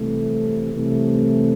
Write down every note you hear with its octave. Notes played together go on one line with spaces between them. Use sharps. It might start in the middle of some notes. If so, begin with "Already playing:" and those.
Already playing: C2 C3 E3 A3
C2 C3 E3 A3